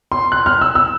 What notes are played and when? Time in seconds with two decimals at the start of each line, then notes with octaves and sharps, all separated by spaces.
0.12 C6
0.32 F#6
0.46 F6
0.61 E6
0.75 E6